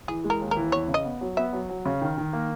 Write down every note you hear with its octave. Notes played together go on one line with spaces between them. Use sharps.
E3 G#4
G#3
A#4
D#2
A#4
E3
E2 C#5
C#3
D#5
B3
F#3
B3 E5
F#3
F#3
C#3
D#3
D#3
A#3